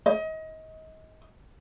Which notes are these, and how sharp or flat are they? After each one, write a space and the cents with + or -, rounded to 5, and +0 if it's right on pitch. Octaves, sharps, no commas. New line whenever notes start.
D#5 +30